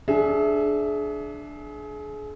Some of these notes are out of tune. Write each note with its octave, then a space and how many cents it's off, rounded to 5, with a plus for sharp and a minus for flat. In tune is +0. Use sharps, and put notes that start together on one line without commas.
D4 +0 G#4 +30 E5 +0